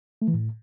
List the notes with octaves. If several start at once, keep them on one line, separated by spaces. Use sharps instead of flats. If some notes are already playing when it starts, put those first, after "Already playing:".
A3
E3
A2